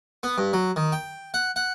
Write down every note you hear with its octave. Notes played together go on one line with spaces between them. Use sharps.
B3
G2
F#3
D#3
G5
F#5
F#5